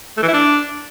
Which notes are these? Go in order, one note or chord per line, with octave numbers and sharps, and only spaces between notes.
A3
E3
E4
D4